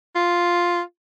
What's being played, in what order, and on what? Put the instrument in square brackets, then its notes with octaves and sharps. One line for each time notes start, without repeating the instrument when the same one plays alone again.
[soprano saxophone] F4